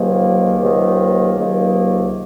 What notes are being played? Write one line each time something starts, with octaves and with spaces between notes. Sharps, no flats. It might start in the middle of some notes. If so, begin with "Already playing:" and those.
Already playing: C#2 C3 D#3 F#3 A#3
C#2 C3 D#3 F#3 A#3
C#2 C3 D#3 F#3 A#3